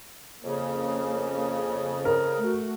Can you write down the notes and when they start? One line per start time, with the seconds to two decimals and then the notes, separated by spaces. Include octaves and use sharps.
0.44 F2 C#3 A#3
2.05 A#4
2.39 A3 F#4